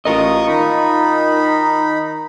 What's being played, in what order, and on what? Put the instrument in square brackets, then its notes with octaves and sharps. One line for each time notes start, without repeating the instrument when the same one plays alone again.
[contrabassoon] A1 [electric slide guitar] F4 A#4 D#5 [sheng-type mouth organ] C#6 D#6
[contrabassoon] D#3 [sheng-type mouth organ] D#4 B5